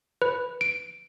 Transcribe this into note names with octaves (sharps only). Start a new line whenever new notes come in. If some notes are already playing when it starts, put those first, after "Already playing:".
B4
D7